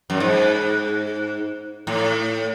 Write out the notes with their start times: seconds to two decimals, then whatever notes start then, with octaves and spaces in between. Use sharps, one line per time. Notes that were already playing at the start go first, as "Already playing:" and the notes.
0.10 F#2
0.20 G#2
1.87 A2